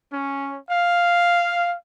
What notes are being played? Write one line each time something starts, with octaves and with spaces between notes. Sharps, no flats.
C#4
F5